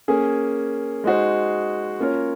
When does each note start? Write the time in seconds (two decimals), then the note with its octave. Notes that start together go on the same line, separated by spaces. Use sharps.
0.08 A#3 C#4 G#4
1.04 G#3 D#4 F#4 C5
2.00 A#3 C#4 F4 A#4 C#5